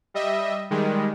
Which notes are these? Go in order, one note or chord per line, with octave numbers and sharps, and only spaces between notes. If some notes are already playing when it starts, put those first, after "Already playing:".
G3 D#5 E5
D#3 G3 G#3